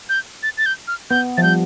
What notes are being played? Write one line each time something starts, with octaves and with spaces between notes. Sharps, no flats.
G6
A6
A6
G6
F6
B3 G6
F3 A6
G3 G6